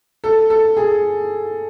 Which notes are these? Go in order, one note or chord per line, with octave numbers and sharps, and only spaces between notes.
A4
A4
G#4